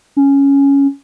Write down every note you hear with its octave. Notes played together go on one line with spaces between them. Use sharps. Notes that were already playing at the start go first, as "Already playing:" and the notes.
C#4